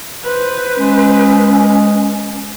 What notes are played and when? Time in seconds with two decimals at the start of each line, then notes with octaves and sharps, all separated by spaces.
0.23 B4 C5
0.77 G#3 C#4